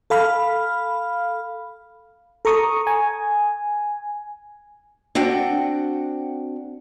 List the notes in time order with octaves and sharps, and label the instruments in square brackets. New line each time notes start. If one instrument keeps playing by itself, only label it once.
[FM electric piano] A4 F5 B5 F6
A4 A#5 C#6 D#6
G#5
[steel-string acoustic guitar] C4 D4 F#4 F#5 G5